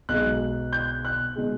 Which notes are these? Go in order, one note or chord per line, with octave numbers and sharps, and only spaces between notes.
B1 B2 G#3 F#6
G6
F#6
B2 G#3